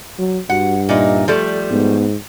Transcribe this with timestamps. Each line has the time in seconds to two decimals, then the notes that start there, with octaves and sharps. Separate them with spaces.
0.19 F#3
0.50 G2 F#4 F#5
0.89 A#2 D#4 E5
1.28 F3 G3 A3 A4
1.70 G#2 B3